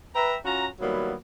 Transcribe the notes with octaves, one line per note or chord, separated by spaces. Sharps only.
B4 E5 G5 A#5
C#4 F4 F#4 A#5
D#3 F#3 G3 A#3 B3 E4